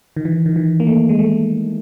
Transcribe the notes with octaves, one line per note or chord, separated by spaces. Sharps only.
D#3
E3
D#3
E3
A#3
A3
G#3
A3